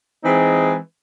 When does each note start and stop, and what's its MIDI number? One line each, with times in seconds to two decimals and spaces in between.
0.24 0.76 52
0.24 0.76 56
0.24 0.76 60
0.24 0.76 63